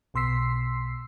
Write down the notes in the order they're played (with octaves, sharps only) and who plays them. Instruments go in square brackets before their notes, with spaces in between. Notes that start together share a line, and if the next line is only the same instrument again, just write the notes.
[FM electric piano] B1 B2 C6 E6 B6 C7